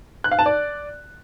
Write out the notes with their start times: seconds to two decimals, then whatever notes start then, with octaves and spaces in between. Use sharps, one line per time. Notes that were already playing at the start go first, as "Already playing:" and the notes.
0.24 F#6
0.32 F5
0.39 A5
0.46 D5